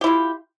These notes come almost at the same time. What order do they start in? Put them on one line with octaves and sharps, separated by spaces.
G4 E4 F4